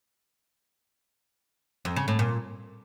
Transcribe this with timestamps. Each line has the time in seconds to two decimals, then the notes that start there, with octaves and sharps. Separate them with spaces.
1.85 F2
1.96 C#3
2.08 A2
2.19 A#2